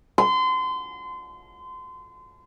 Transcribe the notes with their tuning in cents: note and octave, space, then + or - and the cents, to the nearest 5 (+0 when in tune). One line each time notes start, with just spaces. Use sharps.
C6 -30